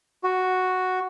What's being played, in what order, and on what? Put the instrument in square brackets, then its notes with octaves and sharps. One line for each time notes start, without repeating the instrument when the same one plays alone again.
[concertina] F#4